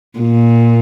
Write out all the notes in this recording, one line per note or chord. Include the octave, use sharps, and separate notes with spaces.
A#2